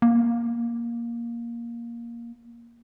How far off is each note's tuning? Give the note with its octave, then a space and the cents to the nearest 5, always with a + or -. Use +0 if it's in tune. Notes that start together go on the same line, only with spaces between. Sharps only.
A#3 +10